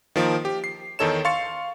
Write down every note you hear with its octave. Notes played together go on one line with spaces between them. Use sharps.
D#3 F3 A#3
G4
C7
E2 D#3 D#4 A4 C#5 E7
F5 C6 C#6 A6 C#7